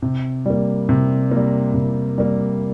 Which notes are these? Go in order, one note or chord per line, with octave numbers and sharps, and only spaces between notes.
C3
G3 A#3
C3
G3 A#3
C3
G3 A#3